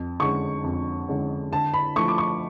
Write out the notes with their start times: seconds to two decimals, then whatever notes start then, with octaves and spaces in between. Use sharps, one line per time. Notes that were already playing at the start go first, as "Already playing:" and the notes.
Already playing: F2
0.20 D3 G#3 C#4 C#6
0.64 F2
1.08 D3 G#3 C#4
1.52 D3 A5
1.74 B5
1.96 F3 A3 C#6
2.08 D6
2.18 C#6